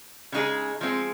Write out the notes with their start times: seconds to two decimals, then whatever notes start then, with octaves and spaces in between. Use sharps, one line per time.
0.32 C#3 G#3 D#4 G#4
0.81 F3 G#3 C4